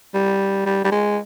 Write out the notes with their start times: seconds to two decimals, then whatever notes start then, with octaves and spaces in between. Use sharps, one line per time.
0.14 G3
0.66 G3
0.84 G3
0.92 G#3